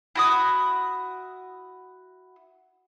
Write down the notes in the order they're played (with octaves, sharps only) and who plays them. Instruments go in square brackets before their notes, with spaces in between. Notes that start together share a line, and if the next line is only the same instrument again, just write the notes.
[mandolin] E4 F#4 D#6